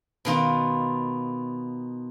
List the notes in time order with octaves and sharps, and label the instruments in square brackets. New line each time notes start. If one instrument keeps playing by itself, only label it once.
[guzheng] B2 D#3 F4